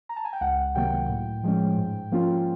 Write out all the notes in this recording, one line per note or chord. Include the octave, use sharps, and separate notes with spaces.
A#5
A5
G#5
G5
C#2 F#5
C3 D#3 F#3 A#3 G5
A2
F3 G#3 C#4
G#2
F3 A#3 C#4 F4